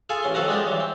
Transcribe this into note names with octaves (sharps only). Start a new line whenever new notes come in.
F4 G#4 A4 G#5
A1 C#4 C6
F2 D#3 F#3 A4 B4 A#5
G3 G#3 B3 D4 F4 G4
E3 F#3
C4